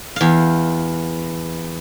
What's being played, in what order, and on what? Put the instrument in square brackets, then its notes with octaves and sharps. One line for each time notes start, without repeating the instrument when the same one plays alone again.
[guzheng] E2 F5